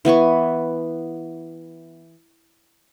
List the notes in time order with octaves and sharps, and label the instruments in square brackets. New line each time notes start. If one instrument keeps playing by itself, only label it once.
[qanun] E3 B3 G#5 C#6